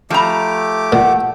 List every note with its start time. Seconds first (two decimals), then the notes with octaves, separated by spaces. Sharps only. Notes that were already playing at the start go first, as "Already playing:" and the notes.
0.10 F3 A3 G4 A#5 D6
0.92 A#2 F#5